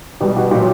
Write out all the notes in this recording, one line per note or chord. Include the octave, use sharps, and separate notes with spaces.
B2 G3 G4
F#4
A#2 F#3 G4